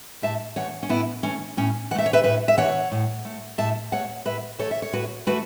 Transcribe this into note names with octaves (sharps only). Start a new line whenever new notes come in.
A2 E5 A5
E3 A3 C#5 F#5
C#4
A2 B3 E4
E3 A3 C#4
A2 C#4
E3 A3 E5 F#5
C#5
B4 E5
A2 B4 E5
E5
E3 A3 C#5 F#5
A2
A3
A2 E5 A5
A3 C#5 F#5
A2 B4 E5
E3 A3 A4 C#5
E5
C#5
A2 F#4 B4
E3 A3 F#4 B4